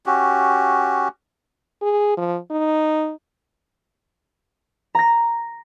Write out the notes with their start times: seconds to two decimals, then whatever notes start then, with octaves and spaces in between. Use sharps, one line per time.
0.06 C#4 F#4 G4
1.82 G#4
2.17 F3
2.51 D#4
4.95 A#5 A#6